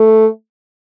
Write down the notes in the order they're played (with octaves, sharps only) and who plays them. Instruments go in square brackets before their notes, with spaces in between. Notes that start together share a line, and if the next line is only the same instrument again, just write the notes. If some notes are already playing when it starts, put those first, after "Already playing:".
Already playing: [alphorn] A3